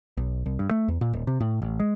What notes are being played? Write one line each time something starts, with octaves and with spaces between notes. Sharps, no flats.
B1
C2
G2
A3
E2
A#2
D#1
C3
A2
A1
G#3